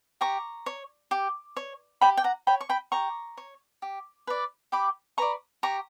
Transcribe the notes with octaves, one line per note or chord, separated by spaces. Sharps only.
G4 A#5 C#6
C#5
G4
C#5
G4 G5 B5
G5
F#5 A#5
C#5 G5 B5
C#6
G5 B5
G4 A#5 C#6
C#5
G4
B4 D5
G4 B5 D6
B4 D5 A#5 C#6
G4 A#5 C#6